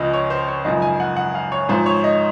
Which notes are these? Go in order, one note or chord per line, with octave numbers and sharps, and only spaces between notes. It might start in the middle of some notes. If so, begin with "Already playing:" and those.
Already playing: C#2 C#3 F3 D#5
C#5
C5
C#5
G#1 F#2 C#3 F3 D#5
G#5
F#5
F#5
F5
C#5
G#1 G#2 F3 C5
C#5
D#5